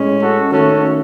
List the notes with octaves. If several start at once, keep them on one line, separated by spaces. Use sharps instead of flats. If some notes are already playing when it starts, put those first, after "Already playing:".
Already playing: A2 G#3 C#4
F#4 A4
D#3 A3 C#4 F#4 A4